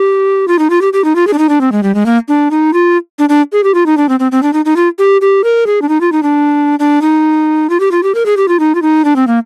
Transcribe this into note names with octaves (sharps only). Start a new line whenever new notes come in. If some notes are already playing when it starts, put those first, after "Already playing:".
Already playing: G4
F4
D#4
F4
G4
G4
D#4
F4
G#4
D4
D#4
D4
C4
G#3
G3
G#3
A#3
D4
D#4
F4
D4
D4
G#4
G4
F4
D#4
D4
C4
C4
C4
D4
D#4
D#4
F4
G4
G4
A#4
G#4
D4
D#4
F4
D#4
D4
D4
D#4
F4
G4
F4
G4
A#4
G#4
G4
F4
D#4
F4
D#4
D4
C4
A#3